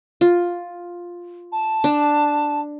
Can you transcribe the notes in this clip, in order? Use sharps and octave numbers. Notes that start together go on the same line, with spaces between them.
F4
A5
D4